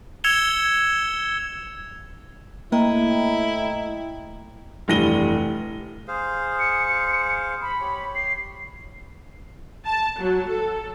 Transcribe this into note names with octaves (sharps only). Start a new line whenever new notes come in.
E6 G#6 C#7 E7 F7 G7
A2 A#3 E4 D#5 G5 A#5
F1 G2 E3 A#6 D#7 G7
G#4 C5 F5
C#7
B5
G4 C#5
C7
A5
F#3
A4